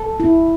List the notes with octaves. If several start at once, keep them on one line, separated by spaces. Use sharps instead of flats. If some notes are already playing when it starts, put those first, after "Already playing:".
Already playing: A4
E4